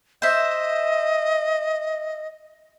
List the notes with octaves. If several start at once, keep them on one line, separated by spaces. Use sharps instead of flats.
C5 D#5 E5